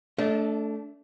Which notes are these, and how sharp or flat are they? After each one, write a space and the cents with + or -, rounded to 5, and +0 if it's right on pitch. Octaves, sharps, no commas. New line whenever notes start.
A3 +0 D4 -25 D#5 +40